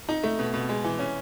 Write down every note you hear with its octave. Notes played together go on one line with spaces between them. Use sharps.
D#4
A3
B2
B2
G#3
E3
C#4